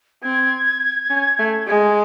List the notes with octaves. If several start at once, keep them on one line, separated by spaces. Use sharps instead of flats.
C4 G#6
C#4
A3
G#3